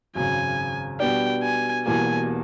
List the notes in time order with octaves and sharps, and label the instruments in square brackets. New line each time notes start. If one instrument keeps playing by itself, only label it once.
[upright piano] G#1 F#2 C#3 [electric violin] G#5
[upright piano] B2 G3 B3 D4 [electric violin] G5
[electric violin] G#5
[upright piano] E1 E2 B2 G3 A#3 [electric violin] G#5